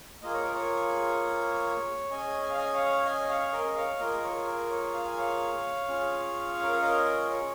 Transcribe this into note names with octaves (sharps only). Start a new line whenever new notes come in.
A#3 F4 G#4 D#5
C#5
A#4
C#5
C#4 G#4 D#5 G#5
G#5
F5
D#5 G#5
C#5 F5
D#5 G#5
C#5 F5
A#4 D#5
C#5 F5
A#3 F4 G#4 A#4 D#5
C#5
A#4
C#5
F5
G#5
C#5 F5
C#4 F4 G#4
A#4
C#5
A#4 D#5
C#5